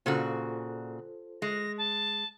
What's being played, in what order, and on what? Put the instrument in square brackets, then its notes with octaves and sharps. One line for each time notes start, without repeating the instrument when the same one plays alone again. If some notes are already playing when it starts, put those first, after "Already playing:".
[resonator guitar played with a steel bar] A#2 C#3 F#4 [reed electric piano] F4 A4 C5
[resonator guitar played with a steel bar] G#3 [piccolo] A#6
[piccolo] A5